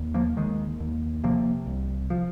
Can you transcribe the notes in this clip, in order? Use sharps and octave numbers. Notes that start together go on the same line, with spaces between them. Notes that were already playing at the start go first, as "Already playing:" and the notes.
Already playing: D#2
F3 A#3
D#2 D#3 G#3
D#2
C3 F3 A#3
C2
F3